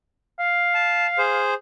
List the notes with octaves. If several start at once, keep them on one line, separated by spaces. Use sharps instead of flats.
F5
A5
G#4 C5